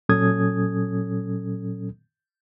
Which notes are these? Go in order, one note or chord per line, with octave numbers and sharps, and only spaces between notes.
A#2 F#3 C#4 A4 D#6 G#6